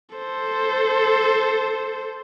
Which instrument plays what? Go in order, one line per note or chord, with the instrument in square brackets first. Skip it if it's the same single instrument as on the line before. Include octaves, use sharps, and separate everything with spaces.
[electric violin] A4 C5